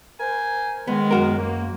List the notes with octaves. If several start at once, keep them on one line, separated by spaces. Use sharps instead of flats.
A#4 C5 G#5
G#2 D#3 G#3 B3
F#2 F#4 A#4
A#3